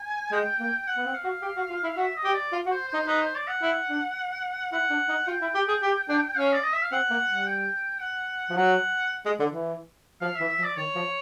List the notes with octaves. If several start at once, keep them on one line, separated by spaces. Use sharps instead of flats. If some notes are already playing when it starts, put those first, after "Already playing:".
Already playing: G#5
G#3 G5
A#3
F#5
B3
C4
F5
F#4
G4
F#4
F4
E4
F#4 E5
D#5
G4
D5
F4
F#4
C5
C5
D#4
D#4 B4
C5
D5
F#5
E4
D4
E4 F#5
D4
D#4
F4 G5
E4
G4
G#4
G4
D4
C#4 F5
D5
D#5
E5
F5
C4 F#5
A#3
G3
G5
F#5
F3
F#3 F#5
G#3
D3
E3
F3 F5
E5
E3
E5
F3
D5
D#3 C#5
F3